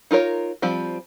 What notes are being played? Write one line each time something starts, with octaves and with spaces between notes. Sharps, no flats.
D#4 F4 A#4 C#5
F3 G3 C4